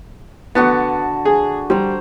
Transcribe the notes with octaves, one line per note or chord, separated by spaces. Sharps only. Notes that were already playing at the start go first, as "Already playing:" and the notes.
D3 B3 F#4 A5
G#4
G3 C5 A#5